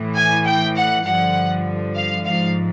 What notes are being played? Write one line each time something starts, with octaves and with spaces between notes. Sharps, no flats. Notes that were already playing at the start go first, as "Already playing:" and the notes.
Already playing: A2 E3
G#5
G5
F#5
G2 D3 F3 F#5
F5
G#2 F3 F5